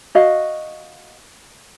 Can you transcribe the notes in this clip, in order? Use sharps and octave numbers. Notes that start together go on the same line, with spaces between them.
F#4 D#5 F5